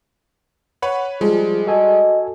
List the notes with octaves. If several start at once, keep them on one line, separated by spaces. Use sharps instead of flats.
B4 C#5 F#5 B5
F3 G3 G#3 G#4
F#4 A4 D#5 G#5